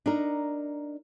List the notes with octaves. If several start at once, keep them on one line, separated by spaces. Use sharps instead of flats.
D4 D#4 A#4